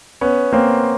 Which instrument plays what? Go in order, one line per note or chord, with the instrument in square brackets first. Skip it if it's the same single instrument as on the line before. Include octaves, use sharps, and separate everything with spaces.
[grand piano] B3 C#4
A#3 C4